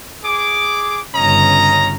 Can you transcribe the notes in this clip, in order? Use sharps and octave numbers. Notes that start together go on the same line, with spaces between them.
G#4 D6
G1 C#3 C#4 D#5 A#5